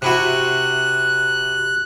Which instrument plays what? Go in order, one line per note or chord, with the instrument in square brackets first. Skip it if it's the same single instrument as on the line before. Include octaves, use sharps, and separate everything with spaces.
[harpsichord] C3 E4 F#4 [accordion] F#6